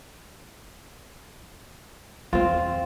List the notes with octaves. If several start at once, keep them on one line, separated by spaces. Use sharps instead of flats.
E2 C4 F4